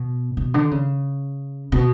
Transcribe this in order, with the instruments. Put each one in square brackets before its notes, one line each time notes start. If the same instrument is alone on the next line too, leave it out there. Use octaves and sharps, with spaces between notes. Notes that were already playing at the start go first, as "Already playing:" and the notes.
Already playing: [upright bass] B2
B2
D3
C#3
B2